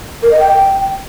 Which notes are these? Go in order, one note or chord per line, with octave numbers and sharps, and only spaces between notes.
A#4
D#5
G5